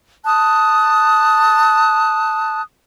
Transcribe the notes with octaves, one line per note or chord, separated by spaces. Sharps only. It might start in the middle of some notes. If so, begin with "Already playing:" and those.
A5 D#6 F#6